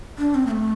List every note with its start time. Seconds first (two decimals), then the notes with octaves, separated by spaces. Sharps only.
0.18 D4
0.35 C4
0.47 A#3
0.51 A3